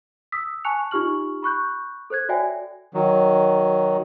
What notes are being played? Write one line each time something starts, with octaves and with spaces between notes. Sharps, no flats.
D#6 E6 B6
G#5 A5 C#6 F#6 C#7 F7
D#4 F4 G4 C#6 F6 F#7
B5 C#6 F#6 G6
A4 C5 F#6 G#6
F#4 C#5 D5 E5 G5 G#5
D#3 F#3